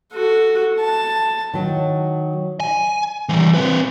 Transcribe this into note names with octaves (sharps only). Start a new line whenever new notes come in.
F#4 A4
A5
D#3 F#3
G#5
E3 G3
C4 B4